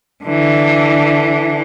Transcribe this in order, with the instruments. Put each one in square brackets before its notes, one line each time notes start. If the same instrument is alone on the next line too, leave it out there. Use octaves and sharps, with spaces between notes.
[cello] D3 E3